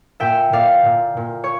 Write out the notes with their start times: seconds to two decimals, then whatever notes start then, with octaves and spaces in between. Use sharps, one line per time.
0.20 A#2 E5 G5
0.52 A#2 D5 F5
0.85 A#2
1.17 A#2
1.44 C#5